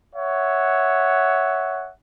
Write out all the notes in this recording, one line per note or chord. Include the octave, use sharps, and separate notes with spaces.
C#5 E5 F#5